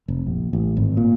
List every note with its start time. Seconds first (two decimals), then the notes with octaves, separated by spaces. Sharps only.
0.08 F1
0.27 A#1
0.53 A1
0.77 G#1
0.97 A#2